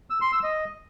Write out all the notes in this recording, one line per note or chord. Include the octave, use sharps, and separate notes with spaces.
E6
C6
E6
D#5